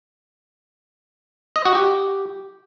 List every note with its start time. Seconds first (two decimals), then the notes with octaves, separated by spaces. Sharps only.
1.56 D#5
1.65 F#4
1.75 G4